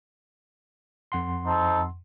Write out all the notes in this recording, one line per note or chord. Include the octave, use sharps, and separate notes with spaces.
F2 F#5 C6
D#4 A4 C5